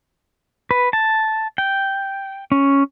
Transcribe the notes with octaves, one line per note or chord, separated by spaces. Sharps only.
B4
A5
G5
C#4